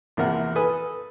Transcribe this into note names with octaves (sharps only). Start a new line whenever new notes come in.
A#1 E2 C3 A#4 F#5
A4 B4 G#5 D#6